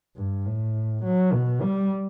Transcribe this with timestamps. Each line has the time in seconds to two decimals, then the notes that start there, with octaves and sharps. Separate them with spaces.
0.16 G2
0.46 A2
1.04 F#3
1.33 B2
1.62 G3